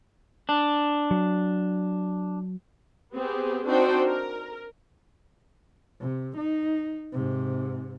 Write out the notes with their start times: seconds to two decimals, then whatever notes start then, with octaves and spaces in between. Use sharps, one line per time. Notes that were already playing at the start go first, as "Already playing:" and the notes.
0.49 D4
1.11 F#3
3.14 B3 C4 G4 G#4
3.66 C4 D4 D#4 F#4 C5 G5
4.05 A#4
6.01 C3
6.37 D#4
7.13 G#2 C3